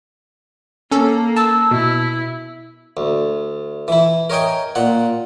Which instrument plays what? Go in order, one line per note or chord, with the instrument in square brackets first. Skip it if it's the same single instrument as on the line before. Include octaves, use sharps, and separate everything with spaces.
[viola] A#3 [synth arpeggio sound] C#4 A4
[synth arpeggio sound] A5 [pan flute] E6
[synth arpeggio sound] B2 [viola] E4
[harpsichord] D2
E3 E4
A#4 C#5 D#5 G5 G#5
A#2 F#5